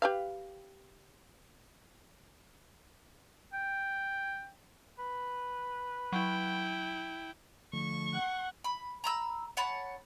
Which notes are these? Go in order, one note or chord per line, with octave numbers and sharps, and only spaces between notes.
G4 B4 F5
G5
B4
F#3 E4 G5
D3 F3 A3 C#6
F#5
B5
A#5 B5 E6
C#5 F#5 A5 B5